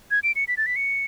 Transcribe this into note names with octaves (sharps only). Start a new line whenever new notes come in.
G#6
D7
C#7
B6
A6
B6
C#7